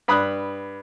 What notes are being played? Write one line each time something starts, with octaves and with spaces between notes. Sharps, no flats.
G2 B5 D#6 F#6